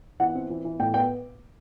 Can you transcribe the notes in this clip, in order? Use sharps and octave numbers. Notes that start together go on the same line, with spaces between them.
E3 F#5
C4
E3
E3
A2 G5
B3 G5